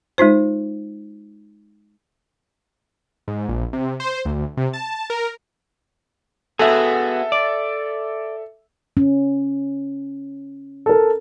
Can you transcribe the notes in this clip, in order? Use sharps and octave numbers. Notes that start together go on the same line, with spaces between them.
G#3 D#4 F4 C5
G#2
A#1
C3
C5
D2
C3
A5
A#4
B3 F#4 G#4 A4 E5
D5
C#4
A4 A#4